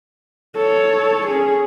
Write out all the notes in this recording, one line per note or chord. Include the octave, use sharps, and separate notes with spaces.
A4 C#5
C#4 G#4